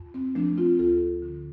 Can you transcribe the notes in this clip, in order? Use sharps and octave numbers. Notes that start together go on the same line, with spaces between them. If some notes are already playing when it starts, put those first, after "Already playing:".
Already playing: F2
C4
F3 A3 D4
C4 F4
D2 F4 A4
D3